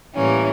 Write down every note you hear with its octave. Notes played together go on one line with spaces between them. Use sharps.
A2 E3 G3 A#3 C#4